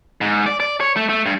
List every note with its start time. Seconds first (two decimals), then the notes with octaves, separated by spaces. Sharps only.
0.21 G#2
0.46 D5
0.60 D5
0.80 C#5
0.97 A3
1.09 A3
1.26 G2